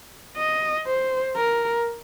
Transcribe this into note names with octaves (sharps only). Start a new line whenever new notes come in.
D#5
C5
A#4